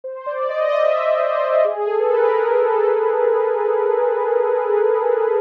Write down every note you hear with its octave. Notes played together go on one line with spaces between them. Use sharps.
C5
D5
D#5
E5
C5
G#4
A4
B4
A#4
A#4
A4